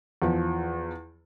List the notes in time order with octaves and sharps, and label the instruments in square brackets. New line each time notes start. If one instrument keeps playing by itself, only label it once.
[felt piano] E2 F3